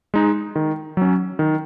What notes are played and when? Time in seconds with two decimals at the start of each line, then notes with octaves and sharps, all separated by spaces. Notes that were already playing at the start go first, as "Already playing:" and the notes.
0.14 G#3 D#4
0.56 D#3
0.97 F#3 C#4
1.39 D#3